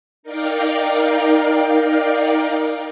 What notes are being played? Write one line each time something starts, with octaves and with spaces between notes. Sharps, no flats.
D#4 A#4 D5 F5 G5